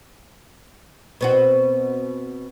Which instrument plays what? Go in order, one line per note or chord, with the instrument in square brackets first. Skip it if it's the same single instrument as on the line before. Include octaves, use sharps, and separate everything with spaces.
[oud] B2 C4 F#4